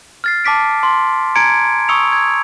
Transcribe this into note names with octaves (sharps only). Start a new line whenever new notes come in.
F6 A6 C7
A5 D6 B6 D7
C6
G#5 A#5 G#6 C#7 D7
C#6 D#6 E6 C#7 F7
G#6